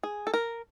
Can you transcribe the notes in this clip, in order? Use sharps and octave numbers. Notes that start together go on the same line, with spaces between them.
G#4
A4
A#4